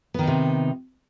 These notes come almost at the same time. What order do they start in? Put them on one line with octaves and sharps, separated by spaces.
B3 D#3 D#4 C3